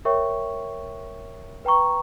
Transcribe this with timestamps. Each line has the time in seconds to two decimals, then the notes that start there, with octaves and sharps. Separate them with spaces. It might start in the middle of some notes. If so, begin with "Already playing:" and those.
0.05 A#4 C#5 E5 G5 C#6
1.65 B4 G5 A#5 C#6